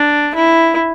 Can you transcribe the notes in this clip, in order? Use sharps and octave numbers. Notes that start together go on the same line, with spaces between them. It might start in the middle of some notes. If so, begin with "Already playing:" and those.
Already playing: D4
E4